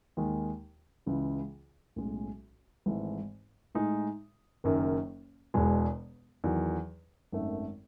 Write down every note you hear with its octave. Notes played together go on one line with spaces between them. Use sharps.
D#2 D#3 G#3
C#2 C#3 E3
B1 A2 G#3 C#4
G#1 G#2 E3 A3
A2 G#3 D#4
F#1 F#2 D#3
E1 E2 B2 G#3
E2 D#3 F#3
G#1 F#2 D#3 A3